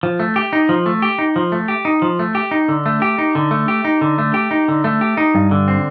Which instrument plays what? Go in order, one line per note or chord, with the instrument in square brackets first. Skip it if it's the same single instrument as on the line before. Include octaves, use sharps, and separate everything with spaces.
[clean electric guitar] F3
A3
G4
D#4
F3
A3
G4
D#4
F3
A3
G4
D#4
F3
A3
G4
D#4
D3
A3
G4
D#4
D3
A3
G4
D#4
D3
A3
G4
D#4
D3
A3
G4
D#4
G2
D3
C4